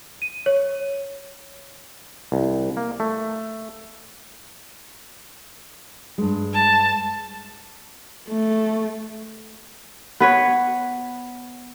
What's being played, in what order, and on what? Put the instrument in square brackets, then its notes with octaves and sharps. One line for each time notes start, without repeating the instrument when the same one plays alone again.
[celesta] D#7
C#5
[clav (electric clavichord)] C2
A#3
A3
[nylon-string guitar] G2 G#3
[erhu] A5
[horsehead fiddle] A3
[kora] B3 B4 C#5